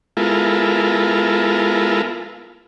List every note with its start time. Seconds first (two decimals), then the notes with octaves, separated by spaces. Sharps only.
0.17 G#3 B3 E4 F4 A4 A#4